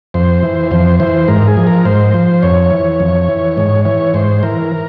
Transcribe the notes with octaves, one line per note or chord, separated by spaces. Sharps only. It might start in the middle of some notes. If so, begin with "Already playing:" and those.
F2 C5
E3
F2 C5
E3 C5
G#2 A#4
G#4
F3
A#4
G#2 C5
F3
F2 C#5
E3
F2
E3
G#2 C#5
E3 C#5
G#2 C5
E3 A#4